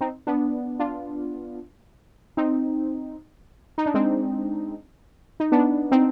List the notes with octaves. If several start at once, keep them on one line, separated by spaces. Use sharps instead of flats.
C4 D#4
B3 D4
D4 F4
C4 D#4
D#4
D4
G#3 C4
D#4
B3 D4
C4 D#4